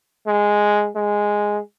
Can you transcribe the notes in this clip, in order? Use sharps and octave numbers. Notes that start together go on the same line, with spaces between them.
G#3
G#3